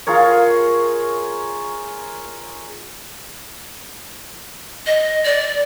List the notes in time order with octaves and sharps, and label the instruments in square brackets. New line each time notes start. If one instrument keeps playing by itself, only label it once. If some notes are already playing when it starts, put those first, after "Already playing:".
[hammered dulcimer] F4 G#4 A#4 C#5
[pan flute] D#5
D5